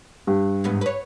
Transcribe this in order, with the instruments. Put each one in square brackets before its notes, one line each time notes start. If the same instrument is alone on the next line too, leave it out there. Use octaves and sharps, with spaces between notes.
[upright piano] G2
[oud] E2 G#2 B3
B4 C#5